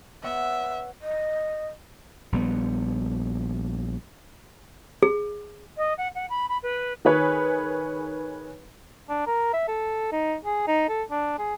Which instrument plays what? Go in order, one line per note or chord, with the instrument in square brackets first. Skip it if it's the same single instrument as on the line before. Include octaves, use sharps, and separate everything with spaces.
[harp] B3 C#5 F#5 [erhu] E5
[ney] D#5
[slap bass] A#1 G3 B3
[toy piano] G#4
[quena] D#5
F#5
F#5
B5
B5
B4
[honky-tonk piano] D#3 G#4 B4 C#5
[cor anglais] D4
A#4
E5
A4
D#4
G#4
D#4
A4
D4
G#4